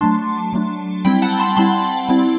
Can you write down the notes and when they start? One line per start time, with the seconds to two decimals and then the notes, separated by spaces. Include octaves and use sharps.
0.01 F#3 A3 D4 A5 C6
0.53 F#3 A3 D4
1.05 G3 C4 E4 G5 B5
1.22 F#5 A5
1.40 A5 C6
1.57 G3 C4 E4 A5 C6
2.09 G3 C4 E4